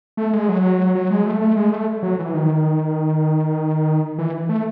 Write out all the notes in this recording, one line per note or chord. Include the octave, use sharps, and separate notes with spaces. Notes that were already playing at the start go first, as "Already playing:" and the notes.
A3
G#3
F#3
F#3
G#3
A3
A3
G#3
A3
F#3
E3
D#3
E3
A3